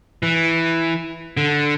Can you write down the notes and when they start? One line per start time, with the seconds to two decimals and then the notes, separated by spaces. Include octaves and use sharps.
0.23 E3
1.37 D3